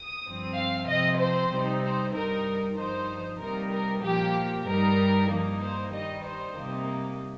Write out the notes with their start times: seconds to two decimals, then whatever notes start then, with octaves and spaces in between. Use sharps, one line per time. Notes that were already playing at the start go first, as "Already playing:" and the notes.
Already playing: D#6
0.24 G2 F3 C4
0.56 F5
0.88 C3 F3 C4 D#5
1.19 C5
1.51 C3 G3 C4 D#4
1.82 C5
2.14 G2 G3 D#4 A#4
2.77 G2 F3 D#4 C5
3.40 C3 G3 A#3 D#4 A#4
3.72 A#4
4.03 A#2 F3 A#3 G4
4.67 G2 G3 D#4 A#4
5.30 G2 F3 A#3 D#4
5.61 C5
5.93 D#3 G3 D#4 D#5
6.24 C5
6.55 C3 G3 A#3 D#4